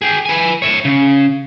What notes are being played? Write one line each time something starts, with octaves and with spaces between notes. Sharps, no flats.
G#4 G5
B4 G#5
C#5 E5
C#3